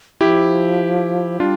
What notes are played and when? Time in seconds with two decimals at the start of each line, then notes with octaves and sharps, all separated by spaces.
0.21 F3 E4 G4
1.40 G3 D4 F4